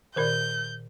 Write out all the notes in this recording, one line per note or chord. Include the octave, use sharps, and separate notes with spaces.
A#2 D#3 A#4 D5 F#6 G6